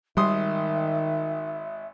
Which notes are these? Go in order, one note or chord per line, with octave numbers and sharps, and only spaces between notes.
G#1 D#3 G3 E5 C6 D#6